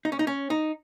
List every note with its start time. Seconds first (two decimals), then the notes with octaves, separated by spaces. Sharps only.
0.05 D#4
0.12 C#4
0.19 D#4
0.27 C#4
0.50 D#4